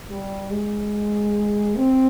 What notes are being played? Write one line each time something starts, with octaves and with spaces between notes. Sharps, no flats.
G3
G#3
C4